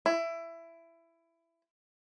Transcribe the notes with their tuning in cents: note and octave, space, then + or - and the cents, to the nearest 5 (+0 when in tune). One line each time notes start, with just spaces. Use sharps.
E4 +15